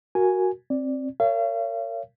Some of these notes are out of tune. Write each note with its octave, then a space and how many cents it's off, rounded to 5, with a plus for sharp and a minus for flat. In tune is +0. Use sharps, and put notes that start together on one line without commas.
F#4 +0 A#4 +0 G#5 +0
C4 +20 D5 +0
A#4 -25 C#5 +15 F5 -40